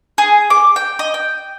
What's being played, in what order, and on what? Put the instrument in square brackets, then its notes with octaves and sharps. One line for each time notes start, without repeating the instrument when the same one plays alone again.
[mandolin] G#4
D6
G5
D#5
G5